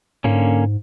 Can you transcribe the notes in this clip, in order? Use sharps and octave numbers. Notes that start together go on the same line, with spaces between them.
G#2 D3 A#3 C#4